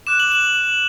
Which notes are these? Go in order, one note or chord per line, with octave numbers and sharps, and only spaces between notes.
D6 F#6 E7
F#7
F#7